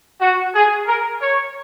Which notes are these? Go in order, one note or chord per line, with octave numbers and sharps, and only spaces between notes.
F#4
G#4
A#4
C#5